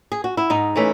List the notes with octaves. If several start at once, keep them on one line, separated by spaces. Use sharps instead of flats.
G#4
F#4
E4
G#2 D#4
E3 A3 C#4